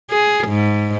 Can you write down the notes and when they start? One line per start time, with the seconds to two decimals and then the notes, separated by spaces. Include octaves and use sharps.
0.11 G#4
0.48 G#2